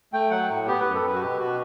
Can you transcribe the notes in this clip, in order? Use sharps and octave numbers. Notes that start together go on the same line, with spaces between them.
A3 G5
F#3 F#5
A2
B3 G4
B4
F#2
A4
F#2 B4
F#4
B2 G4
B2 F#4